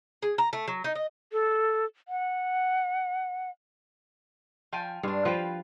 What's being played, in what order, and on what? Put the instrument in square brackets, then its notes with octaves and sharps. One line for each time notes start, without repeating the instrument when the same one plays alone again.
[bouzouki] G#4
A#5
A3
F#3
D#4
D#5
[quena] A4
F#5
[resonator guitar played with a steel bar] F3 G5 G#5
[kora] G2 F5 [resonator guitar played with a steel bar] G#3 D4
[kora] F3 C5 [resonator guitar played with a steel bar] F4 B4 G5